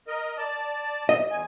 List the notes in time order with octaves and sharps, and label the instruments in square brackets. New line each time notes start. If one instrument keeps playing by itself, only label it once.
[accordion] A#4 D#5
D5 A5
[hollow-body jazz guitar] D#5
[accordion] E2 G#5